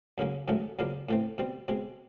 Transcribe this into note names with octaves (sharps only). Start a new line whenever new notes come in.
F#2 C#3 F#3 A#3 C#4
G#2 D#3 F#3 A3 C#4
F#2 C#3 F3 A#3 D4
A2 E3 A3 C4
B2 G3 C4
B2 G#3 C4